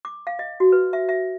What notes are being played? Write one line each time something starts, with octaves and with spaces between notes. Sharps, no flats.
D6
F5
D#5
F#4
B4
E5
E5